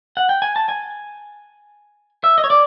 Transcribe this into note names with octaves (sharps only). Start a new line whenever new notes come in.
F#5
G5
G#5
A5
G#5
E5
D#5
C#5
D5